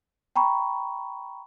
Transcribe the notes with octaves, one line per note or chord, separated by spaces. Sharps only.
G5 A#5 B5 C#6